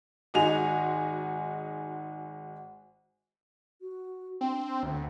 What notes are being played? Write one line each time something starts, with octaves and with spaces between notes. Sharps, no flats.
G#1 G#3 D#4 F#4 G#5 F7
F#4
C4 D4
D2